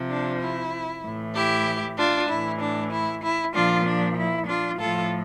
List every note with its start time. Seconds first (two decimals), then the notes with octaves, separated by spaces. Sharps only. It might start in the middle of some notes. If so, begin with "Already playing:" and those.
Already playing: C3 F3
0.09 D4
0.41 E4
1.03 A2 E3
1.34 E4 G4
1.97 D4 F4
2.28 A2 E3 E4
2.60 D4
2.91 E4
3.22 E4
3.54 A#2 F3 D4 F4
3.86 D4
4.16 E4
4.48 D4 F4
4.79 A2 F3 F4 A4